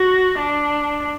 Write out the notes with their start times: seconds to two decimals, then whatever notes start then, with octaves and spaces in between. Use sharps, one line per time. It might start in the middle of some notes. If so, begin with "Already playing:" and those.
Already playing: F#4
0.39 D4